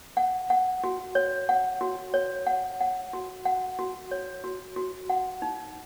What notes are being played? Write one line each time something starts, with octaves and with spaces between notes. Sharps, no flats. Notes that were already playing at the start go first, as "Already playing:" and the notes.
F#5
F#5
F#4
C#5
F#5
F#4
C#5
F#5
F#5
F#4
F#5
F#4
C#5
F#4
F#4
F#5
D#4